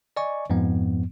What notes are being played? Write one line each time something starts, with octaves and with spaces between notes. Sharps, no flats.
D5 D#5 G#5 C#6
F2 G#2 F3 B3